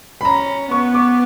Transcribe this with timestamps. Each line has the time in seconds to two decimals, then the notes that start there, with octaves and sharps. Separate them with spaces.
0.21 B5
0.25 C#4 A#5
0.71 B3 C#6
0.94 D6